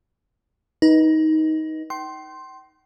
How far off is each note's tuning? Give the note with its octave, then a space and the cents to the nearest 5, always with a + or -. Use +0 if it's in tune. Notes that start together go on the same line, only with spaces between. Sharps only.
D#4 +15 B4 -25
G5 -35 C6 +10